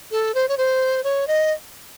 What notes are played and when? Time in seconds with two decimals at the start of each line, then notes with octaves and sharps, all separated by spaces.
0.12 A4
0.35 C5
0.49 C#5
0.57 C5
1.04 C#5
1.28 D#5